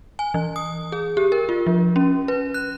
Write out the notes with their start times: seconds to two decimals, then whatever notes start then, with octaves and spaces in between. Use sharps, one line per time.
0.19 G#5
0.34 E3
0.56 D#6
0.92 G#4
1.17 G4
1.32 A#4
1.49 F4
1.67 F3
1.96 C#4
2.28 B4
2.54 F#6